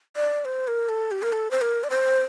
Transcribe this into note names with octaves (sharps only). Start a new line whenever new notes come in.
D5
C5
A#4
A4
G4
A#4
A4
C5
A#4
D5
C5